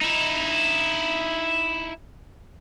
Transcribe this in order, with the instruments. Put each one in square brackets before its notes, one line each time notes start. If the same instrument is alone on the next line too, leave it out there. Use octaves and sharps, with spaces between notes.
[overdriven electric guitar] D#4 E4